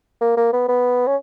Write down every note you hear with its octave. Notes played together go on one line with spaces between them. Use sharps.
A#3
A#3
B3
B3
C#4